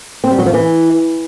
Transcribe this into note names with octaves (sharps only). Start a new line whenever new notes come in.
C4
G3
F#3
F3
E3